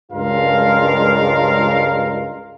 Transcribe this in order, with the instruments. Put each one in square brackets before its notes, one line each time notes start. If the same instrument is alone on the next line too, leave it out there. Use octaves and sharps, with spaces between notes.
[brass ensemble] C#2 G2 G#3 F4 A#4 F5